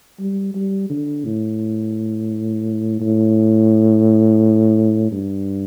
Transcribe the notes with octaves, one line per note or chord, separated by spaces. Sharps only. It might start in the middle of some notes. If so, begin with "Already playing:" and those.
G3
G3
D3
A2
A2
G2